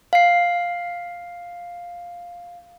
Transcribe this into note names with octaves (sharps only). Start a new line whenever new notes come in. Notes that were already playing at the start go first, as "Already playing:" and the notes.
F5 C7